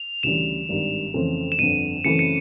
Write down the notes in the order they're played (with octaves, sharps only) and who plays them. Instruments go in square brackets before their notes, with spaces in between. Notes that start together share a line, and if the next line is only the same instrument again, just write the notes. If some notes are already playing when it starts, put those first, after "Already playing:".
Already playing: [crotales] F7
[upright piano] D2 C#3 E3 G3 [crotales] E7
[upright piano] G#1 G2 D#3 G3
F2 C#3 E3 A3 C4
[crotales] E7
[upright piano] G1 F2 D3 [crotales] D#7
[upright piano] F#2 C#3 E3 A3 C4 [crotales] C#7
[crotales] C#7